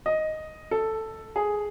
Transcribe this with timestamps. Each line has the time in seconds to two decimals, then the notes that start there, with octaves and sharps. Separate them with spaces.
0.06 D#5
0.71 A4
1.36 G#4